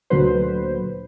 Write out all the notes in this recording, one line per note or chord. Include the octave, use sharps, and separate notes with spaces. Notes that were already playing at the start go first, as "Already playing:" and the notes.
D2 A#2 D3 F#3 B4 C5